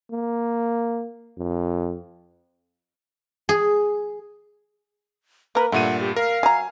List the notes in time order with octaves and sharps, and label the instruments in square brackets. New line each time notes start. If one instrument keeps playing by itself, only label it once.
[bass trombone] A#3
F2
[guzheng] G#4
[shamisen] A#3 A#4 [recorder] B4
[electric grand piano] G2 A#2 D#7 [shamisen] A3 [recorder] F#5
[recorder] G4
[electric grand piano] A#4 [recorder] F5
[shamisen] F#3 A#5 [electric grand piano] G#5